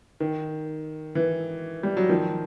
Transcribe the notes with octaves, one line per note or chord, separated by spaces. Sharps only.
D#3
E3
G3
F#3
D#3 F3